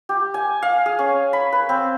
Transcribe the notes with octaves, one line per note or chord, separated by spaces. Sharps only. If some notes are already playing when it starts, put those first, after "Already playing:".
G4
G#5
F5
G#4
C#4
B5
B4
C4